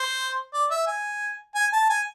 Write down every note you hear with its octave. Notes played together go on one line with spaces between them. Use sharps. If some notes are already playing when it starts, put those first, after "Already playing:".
Already playing: C5
D5
E5
G#5
G#5
A5
G#5